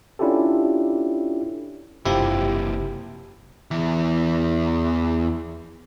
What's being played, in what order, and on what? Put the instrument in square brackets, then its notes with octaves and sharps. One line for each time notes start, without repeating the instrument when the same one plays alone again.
[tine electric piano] C#4 D4 E4 F4 G4 A4
[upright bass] F#1 [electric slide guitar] C3 A#3 [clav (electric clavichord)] F3 E4 [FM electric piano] G4
[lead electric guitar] E2 E3